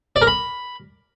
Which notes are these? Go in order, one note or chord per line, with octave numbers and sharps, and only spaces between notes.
D5
A#4
B5